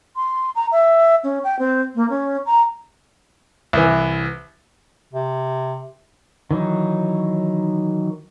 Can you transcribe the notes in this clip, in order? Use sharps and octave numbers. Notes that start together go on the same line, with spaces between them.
C6
A#5
E5
C#4
G5
C4
A#3
C#4
A#5
C2 E3
C3
D#3 E3 F#3 D#4